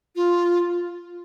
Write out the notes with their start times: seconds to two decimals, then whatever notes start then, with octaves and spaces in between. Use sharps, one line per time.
0.16 F4